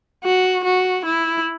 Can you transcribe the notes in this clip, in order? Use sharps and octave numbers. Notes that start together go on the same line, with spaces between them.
F#4
F#4
E4